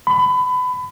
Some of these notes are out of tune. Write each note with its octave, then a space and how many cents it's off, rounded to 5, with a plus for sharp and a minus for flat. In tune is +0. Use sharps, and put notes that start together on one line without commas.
B5 +25